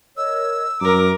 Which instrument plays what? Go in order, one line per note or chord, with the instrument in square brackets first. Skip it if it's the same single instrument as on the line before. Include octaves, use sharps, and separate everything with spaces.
[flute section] A#4 C#5 D#5 [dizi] E6
[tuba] F#2 [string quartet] A#4 D6 [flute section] A#5